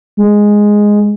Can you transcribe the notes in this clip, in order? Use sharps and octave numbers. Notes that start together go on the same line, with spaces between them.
G#3